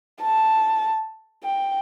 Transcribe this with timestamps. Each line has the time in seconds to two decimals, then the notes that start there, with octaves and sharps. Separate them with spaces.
0.22 A5
1.44 G5